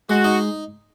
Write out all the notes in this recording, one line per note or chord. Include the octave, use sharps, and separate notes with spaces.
G#3 F#4
D#4